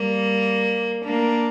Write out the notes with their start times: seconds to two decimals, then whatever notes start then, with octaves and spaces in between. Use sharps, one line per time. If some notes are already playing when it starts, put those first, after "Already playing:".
Already playing: G3 A#3
1.04 A#3 D4